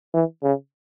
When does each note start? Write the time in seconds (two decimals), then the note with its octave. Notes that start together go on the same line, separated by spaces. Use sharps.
0.14 E3
0.43 C#3